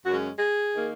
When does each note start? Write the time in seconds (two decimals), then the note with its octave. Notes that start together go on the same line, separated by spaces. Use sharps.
0.06 F#2 C#3 G#3 C#4 F#4
0.39 G#4
0.75 D#3 A#3